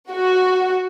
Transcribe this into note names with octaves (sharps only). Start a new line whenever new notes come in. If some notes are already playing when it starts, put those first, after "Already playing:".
F#4